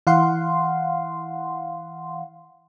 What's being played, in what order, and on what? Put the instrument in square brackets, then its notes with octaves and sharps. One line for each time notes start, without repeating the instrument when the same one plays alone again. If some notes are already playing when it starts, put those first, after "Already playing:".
[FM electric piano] E3 F5 F#5 C6